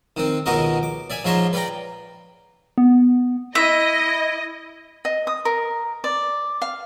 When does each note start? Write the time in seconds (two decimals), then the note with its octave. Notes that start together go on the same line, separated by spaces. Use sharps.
0.17 D#3 C4
0.46 C#2 B2 D#3 F#4 A#4 D#5
0.83 D6
1.10 D5 E5 G#5
1.25 G#2 F3 C#5 E5 A#5 C6
1.53 B4 D5 F5 G5 A#5
2.78 B3
3.55 E4 D#5 E5
5.05 D#5
5.27 D#6
5.45 A#4
6.04 D5
6.62 F5